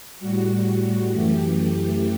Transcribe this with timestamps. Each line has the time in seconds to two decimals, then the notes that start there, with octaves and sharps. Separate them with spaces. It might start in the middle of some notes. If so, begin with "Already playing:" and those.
0.20 A2 G3 F#4
1.11 F#2 E3 A3 G4